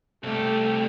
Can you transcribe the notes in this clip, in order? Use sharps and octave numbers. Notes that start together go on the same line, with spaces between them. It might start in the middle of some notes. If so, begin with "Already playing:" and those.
C2 A3 G4